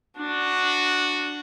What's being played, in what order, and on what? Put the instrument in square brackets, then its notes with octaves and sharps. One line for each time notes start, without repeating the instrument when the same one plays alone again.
[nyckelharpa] D4 [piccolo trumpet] F#4